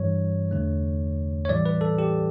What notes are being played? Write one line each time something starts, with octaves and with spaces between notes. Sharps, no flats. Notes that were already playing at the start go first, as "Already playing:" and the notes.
Already playing: G2 E3 G3 C#5
E2 D3 A3
C#5
A2 E3 G3 D5
B4
A4
G4